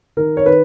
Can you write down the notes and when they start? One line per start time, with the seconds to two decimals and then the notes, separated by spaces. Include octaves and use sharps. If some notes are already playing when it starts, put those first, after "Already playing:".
0.17 D#3 A#4
0.37 C#5
0.46 D#3 B4